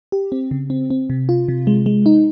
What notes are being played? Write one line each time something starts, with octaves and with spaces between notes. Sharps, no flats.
G4
C4
C#3
C4
C4
C3
F4
C3
G#3
G#3
D#4